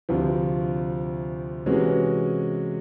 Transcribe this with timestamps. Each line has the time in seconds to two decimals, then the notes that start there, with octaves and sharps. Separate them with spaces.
0.09 D2 C3 F3
1.66 C3 E3 G#3 C#4 F#4